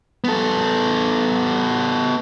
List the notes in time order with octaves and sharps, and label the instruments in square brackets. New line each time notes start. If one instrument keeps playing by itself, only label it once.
[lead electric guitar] B3 A4